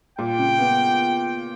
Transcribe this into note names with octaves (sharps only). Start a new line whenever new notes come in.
A#2 G5
C#3
B3